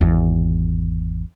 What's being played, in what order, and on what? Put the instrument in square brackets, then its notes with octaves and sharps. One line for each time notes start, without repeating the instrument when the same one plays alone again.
[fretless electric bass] G#1 E2